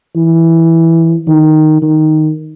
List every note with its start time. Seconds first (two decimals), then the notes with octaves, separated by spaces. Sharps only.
0.16 E3
1.27 D#3
1.82 D#3